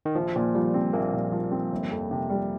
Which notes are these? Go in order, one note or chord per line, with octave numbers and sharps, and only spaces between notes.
D#3
A#1 F3
A#2
F3 G3
C4
A#1 A#3
A#2
F3
C4
G1
F2
C3
G3